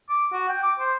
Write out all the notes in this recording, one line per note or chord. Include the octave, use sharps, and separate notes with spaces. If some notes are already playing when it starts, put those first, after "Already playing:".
D6
F#4
G5
D6
C5